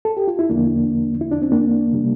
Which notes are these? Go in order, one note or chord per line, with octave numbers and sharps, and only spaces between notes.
A4
G4
F4
E4
E2 D3 F3 A#3 D4
E4
D4
C4
A#3 D4
C3 G3